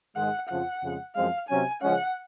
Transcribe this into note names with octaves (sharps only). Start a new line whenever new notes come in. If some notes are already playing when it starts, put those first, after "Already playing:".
G#2 D#3 G#3 F#5
F2 C#3 F3 F#5
F2 C#3 G#3
F#2 F3 G#3 C4 F5
C3 F#3 C#4 G#5
C#3 F3 G#3 C#4 F#5